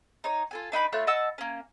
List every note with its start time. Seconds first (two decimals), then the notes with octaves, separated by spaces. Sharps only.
0.24 D#4 C#5
0.51 F4 A4 G#5
0.72 D4 D#4 B4 B5
0.92 A3 F4 C#5 F#6
1.07 D#5 F#5 A5 E6
1.38 A#3 C#4